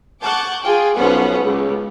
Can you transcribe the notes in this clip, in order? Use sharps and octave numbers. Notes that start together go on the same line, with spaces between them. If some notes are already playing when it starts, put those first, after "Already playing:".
F#5 A5 C#6 D6 G6
F4 G#4 G5 G#5
B1 F3 B3 C#4 F#5
C#2